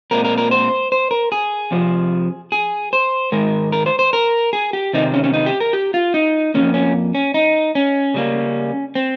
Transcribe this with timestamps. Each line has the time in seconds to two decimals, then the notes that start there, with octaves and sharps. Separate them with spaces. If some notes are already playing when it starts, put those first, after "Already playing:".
0.11 A#2 G#3 C4 A#4
0.25 A#4
0.38 A#4
0.51 C5
0.92 C5
1.11 A#4
1.32 G#4
1.71 F2 C3 F3
2.52 G#4
2.93 C5
3.32 G#2 D#3 G#3 A#4
3.72 A#4
3.86 C5
3.99 C5
4.13 A#4
4.53 G#4
4.73 G4
4.93 C3 D#3 G3 C4 D#4
5.14 C#4
5.24 C#4
5.34 D#4
5.46 G4
5.60 A#4
5.73 G4
5.94 F4
6.14 D#4
6.54 D#3 A#3 C#4
6.59 F2
6.74 C#4
7.15 C#4
7.34 D#4
7.75 C#4
8.14 C#3 G3 A#3
8.95 C4